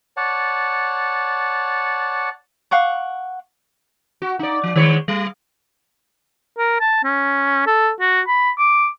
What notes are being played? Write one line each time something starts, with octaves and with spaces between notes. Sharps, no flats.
C#5 D5 F#5 A5
F5 F#5 C#6 D6
F#4
D#4 D5
F3
D#3 G#3 C#5
G3
A#4
A5
C#4
A4
F#4
B5
D6